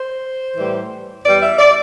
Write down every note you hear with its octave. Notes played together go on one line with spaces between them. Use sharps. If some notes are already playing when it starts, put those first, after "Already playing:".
Already playing: C5
A2 E3 G3
E2 E3 G3 D5
E5
D5